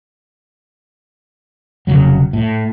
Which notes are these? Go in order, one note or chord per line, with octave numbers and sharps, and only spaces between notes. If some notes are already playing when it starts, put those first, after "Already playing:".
F1 D#2 C#3 F#3
A2